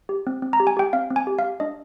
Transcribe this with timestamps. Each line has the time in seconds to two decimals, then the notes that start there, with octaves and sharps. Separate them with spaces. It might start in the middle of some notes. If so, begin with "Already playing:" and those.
0.09 G4
0.27 C4
0.42 C4
0.53 A#5
0.60 G4
0.67 G#5
0.77 G4 G5
0.93 C4 F5
1.10 C4
1.16 G#5
1.27 G4
1.39 F5
1.44 G4
1.60 D4 D#5